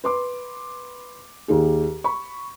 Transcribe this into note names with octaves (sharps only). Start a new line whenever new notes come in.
B4 C6 D6
D#2 D#3 G#4
B5 C#6